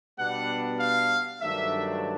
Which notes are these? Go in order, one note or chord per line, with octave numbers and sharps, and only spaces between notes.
B2 G3 B3 D4 F#5
F5
G2 D#3 F#3 A3 D4 E5